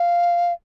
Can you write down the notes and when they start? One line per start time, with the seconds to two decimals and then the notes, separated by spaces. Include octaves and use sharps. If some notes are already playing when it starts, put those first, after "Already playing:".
Already playing: F5